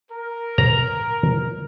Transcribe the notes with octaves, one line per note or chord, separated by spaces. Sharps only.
A#4
A#5